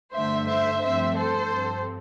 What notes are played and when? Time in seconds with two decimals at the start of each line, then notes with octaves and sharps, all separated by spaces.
0.14 G2 D3 A3 C5 E5
0.48 C5 E5
0.82 G2 F3 A3 C4 C5 E5
1.16 A4 C5
1.51 G2 F3 C4